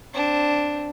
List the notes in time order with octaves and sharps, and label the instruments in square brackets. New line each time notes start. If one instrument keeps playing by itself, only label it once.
[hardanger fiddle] C4 D4